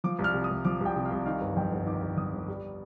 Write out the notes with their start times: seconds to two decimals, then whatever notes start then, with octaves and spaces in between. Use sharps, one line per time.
0.04 F3 D6
0.19 C2
0.24 F6
0.34 C3
0.44 D#6
0.49 C2
0.65 F3 D6
0.80 C2
0.86 G5
0.96 C3
1.05 F5
1.10 C2
1.26 D#3 F5
1.41 G1
1.56 F2 G5
1.72 G1
1.86 D#3 D6
2.02 G1
2.17 F2 D#6
2.33 G1
2.48 G3